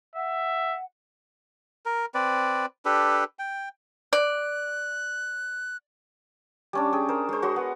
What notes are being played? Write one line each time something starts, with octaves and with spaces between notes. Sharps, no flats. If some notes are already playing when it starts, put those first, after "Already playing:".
E5 F#5
A#4
C4 B4 D5
D4 G4 A4 B4
G5
D5 F#6
G3 C#4 D4
G#4 G5
A#4 C5
G#3 C5
F#4 C#5 C6
B3